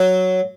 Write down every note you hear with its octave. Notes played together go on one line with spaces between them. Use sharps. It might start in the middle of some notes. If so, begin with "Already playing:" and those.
Already playing: F#3